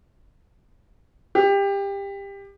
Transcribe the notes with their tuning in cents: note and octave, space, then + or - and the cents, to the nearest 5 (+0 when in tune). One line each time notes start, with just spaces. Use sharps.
G4 +20